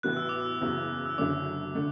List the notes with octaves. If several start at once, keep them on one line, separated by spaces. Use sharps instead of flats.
A1 A2 E3 B3 F#4 F#6
E6
D6
E6
F#1 E2 C#3 F#3
E6
F#1 F#2 D3 A3 C#4 D6
D3 A3